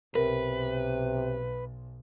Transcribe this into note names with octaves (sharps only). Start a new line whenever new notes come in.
B1 C3 A#4 B4